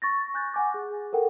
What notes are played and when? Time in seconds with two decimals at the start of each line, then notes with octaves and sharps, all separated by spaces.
0.02 C#6 A6 A#6
0.34 G#5 F#6 G6 A6
0.54 F#5 G#5 D6
0.74 G#4
1.13 A4 A#4 F#5 G5